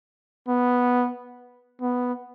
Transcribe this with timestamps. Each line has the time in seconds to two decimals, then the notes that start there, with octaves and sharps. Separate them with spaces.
0.48 B3
1.81 B3